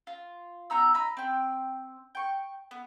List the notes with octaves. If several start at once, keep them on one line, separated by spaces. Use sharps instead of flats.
F4
B3 D#4 A#5 E6
D#5 A#5 B5
C4 G5
G5 C#6
B3